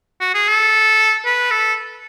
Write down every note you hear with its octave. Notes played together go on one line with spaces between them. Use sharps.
F#4
G#4
A4
B4
A4